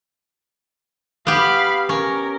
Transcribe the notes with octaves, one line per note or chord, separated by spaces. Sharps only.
B3 G4 F5 B5
C#4 A#4